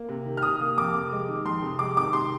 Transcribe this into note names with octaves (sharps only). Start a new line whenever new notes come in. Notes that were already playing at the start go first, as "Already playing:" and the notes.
Already playing: A#3
C3
D#3
F6
C3 D#6
A#3
F2 D6
C3
G#3
D#3
F2 C6
C3
G#3 D6
D#3 D6
C3 C6